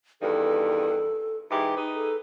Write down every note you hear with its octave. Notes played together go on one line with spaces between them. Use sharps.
E2 G2 D#3 A4
G#2 E3 G4
D#4 G#4 B4
A4